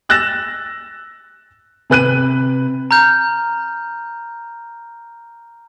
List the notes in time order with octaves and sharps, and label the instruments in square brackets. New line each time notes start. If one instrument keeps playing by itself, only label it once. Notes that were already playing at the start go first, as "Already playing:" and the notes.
[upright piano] E6 F#6 A6 A#6 E7
C3 B4 F#6 D#7
[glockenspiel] A#5 F6 G6